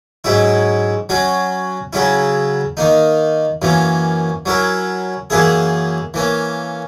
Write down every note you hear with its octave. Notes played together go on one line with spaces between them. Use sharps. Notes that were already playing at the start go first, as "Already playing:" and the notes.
G#2 F#3 C#4 E4
F#3 C#4 F#4
C#3 F#3 C#4 E4
D#3 A#3 D#4
F#2 E3 A#3 C#4
F#3 C#4 E4 A#4
F#2 E3 A#3 E4 G#4
E3 A#3 C#4